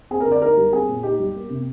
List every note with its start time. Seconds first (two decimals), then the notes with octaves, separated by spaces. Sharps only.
0.11 C4 G#4
0.21 A#4
0.26 D3
0.32 D5
0.42 D#4 A#4
0.57 G3
0.72 C4 G#4
0.89 A#2
1.03 D#4 G4
1.20 G3
1.35 A#3
1.50 C3